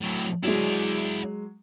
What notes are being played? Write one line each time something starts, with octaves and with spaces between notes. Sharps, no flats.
A2 F#3
F#3 G#3 E4 D5